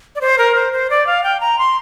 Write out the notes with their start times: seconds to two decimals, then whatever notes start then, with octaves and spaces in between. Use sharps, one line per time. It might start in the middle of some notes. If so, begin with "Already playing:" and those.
0.15 D5
0.21 C5
0.38 A#4
0.55 C5
0.73 C5
0.90 D5
1.07 F5
1.24 G5
1.40 A#5
1.59 C6